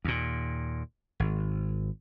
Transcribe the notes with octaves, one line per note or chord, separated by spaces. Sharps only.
D#2 A#2
G#1